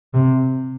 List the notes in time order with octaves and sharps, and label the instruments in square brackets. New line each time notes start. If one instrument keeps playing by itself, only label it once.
[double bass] C3